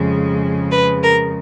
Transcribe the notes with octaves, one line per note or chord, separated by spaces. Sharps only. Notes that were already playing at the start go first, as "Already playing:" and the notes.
Already playing: F2 C#3 G#3
B4
A#4